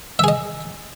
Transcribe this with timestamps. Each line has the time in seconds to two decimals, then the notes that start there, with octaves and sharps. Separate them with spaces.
0.19 E5
0.24 G#4
0.28 D#5